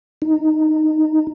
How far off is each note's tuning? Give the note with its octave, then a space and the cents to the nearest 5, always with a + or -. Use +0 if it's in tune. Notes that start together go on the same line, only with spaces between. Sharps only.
D#4 -5